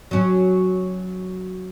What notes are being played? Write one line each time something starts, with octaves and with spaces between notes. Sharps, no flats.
F#3 C#4